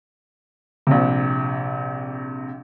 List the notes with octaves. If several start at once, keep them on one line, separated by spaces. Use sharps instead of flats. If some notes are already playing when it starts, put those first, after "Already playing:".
A#1 C3